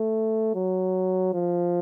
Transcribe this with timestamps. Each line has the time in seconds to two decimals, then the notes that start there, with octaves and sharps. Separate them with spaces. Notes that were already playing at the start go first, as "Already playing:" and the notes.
Already playing: A3
0.55 F#3
1.34 F3